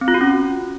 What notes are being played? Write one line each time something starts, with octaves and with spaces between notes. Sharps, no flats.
C4
F4
F#4
C#4